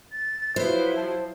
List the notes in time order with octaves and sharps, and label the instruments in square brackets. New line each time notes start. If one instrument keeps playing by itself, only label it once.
[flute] A6
[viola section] F3 F#3 E4 [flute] B4 [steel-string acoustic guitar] C5
[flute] A5